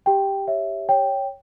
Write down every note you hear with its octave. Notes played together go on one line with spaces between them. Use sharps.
G4 G5
C#5 E5
C#5 G5